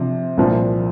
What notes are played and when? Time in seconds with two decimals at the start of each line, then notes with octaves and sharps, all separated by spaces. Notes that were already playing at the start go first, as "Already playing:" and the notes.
Already playing: C3 F3 D4
0.37 C2 A#2 F3 D4